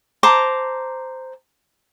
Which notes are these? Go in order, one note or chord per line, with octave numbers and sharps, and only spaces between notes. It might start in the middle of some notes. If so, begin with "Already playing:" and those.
C5 A5 A#5 D6